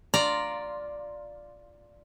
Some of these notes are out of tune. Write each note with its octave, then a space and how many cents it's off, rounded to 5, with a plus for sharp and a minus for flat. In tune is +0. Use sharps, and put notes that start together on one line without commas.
F4 +0 D5 +0 A#5 +0